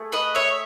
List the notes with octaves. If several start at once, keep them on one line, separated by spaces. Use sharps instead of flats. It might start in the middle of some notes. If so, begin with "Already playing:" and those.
Already playing: A3 G#4
B4 D#5
C#5 E5